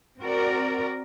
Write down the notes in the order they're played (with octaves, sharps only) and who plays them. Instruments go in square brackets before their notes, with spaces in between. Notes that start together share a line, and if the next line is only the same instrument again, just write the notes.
[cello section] C4 F#4 A#4 D5